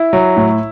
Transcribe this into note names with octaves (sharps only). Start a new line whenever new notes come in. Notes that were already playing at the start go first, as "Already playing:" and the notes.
Already playing: E4
F#3
A2